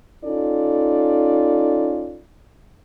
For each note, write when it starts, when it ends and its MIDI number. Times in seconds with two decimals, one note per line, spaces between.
0.24 2.20 61
0.24 2.20 63
0.24 2.20 65
0.24 2.20 69
0.24 2.20 74